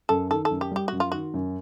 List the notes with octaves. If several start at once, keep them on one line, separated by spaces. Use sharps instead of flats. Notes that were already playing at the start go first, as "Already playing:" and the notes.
F#2 A4
D#3 A4
A4
F#2
G4
G3 G4
F#2 F#4
F4
D#3 F#4
F#2